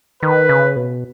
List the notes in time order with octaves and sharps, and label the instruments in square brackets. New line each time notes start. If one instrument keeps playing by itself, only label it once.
[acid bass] D#3 [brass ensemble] B4
[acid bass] C#3
B2